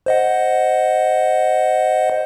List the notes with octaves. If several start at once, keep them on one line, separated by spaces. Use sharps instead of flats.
C5 D#5 F#5